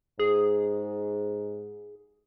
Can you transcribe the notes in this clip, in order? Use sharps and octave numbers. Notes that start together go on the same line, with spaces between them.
G#2 G#4